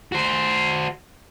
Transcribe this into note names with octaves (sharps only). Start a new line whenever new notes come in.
F#4 C5